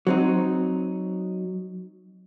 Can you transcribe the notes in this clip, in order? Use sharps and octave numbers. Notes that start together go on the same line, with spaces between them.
F#3 C4 D#4